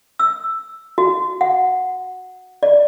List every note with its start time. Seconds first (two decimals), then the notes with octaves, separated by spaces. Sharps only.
0.19 E6
0.98 F#4
1.41 F#5
2.63 D5